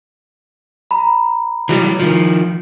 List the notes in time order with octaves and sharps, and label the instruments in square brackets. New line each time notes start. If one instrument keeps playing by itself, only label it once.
[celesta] A#5 B5
[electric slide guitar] E3 F#3 G3
D#3 F3